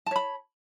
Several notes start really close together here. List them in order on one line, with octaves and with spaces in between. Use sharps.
A5 C#5 B5